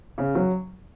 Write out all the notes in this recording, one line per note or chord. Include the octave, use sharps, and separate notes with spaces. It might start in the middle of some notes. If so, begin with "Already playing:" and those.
C#3
F#3